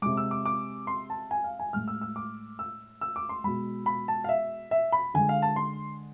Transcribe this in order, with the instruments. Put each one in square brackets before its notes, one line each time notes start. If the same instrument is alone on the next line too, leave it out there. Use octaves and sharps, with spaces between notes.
[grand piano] C3 G#3 D6
E6
D6
D6
C6
A5
G#5
F5
G#5
A2 G#3 F6
E6
E6
D6
E6
E6
D6
C6
B2 G#3 B5
B5
A5
F5
E5
E5
B5
D3 G#3 G#5
F5
A5
C6